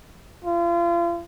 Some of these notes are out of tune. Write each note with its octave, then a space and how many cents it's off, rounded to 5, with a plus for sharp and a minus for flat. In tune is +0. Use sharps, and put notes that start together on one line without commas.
F4 -35